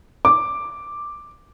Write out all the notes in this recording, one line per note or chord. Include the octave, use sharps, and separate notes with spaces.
D6